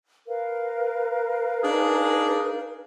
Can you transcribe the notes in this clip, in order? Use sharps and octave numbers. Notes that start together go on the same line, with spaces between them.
A#4 B4 F5
D4 D#4 G#4